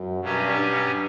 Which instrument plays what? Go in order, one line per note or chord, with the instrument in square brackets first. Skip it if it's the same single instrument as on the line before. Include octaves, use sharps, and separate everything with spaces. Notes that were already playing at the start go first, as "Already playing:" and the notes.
Already playing: [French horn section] F#2
[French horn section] G2 [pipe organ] B2 F#3 C#4 G4
[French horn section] G2